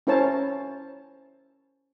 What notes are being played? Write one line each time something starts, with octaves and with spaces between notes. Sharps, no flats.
C#4 E4 A#4 C5 C#5 A5